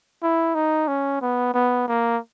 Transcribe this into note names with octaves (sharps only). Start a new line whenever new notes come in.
E4
D#4
C#4
B3
B3
A#3